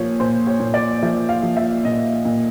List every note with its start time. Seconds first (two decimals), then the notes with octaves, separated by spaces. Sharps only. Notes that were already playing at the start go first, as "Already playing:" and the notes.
Already playing: A#2 F3 C#5
0.20 A#2 C5
0.47 C#5
0.60 A#2
0.74 D5
1.02 F3 E5
1.29 F5
1.43 F3
1.57 E5
1.85 A#2 D#5
2.25 A#2